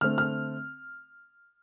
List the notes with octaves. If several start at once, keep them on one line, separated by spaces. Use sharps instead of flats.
D3 A3 C4 F6
F6